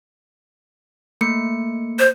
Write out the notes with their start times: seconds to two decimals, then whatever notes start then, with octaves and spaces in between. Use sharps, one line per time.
1.21 A3 A#3 C#7
1.99 C5